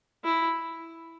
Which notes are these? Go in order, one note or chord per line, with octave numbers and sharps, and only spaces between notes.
E4